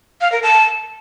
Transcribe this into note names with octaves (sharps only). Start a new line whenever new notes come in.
F5
A#4
A5